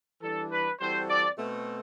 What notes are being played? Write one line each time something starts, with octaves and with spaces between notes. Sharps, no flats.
E3 G3 D4 A4
B4
E3 G3 C4 F#4 A4 C5
D5
B2 A3 C4